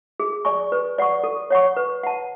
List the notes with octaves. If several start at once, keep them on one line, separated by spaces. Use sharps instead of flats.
G#4
D5 G#5 C#6
B4
D5 F#5 C#6
A4
C#5 F#5 C#6
B4
F#5 A5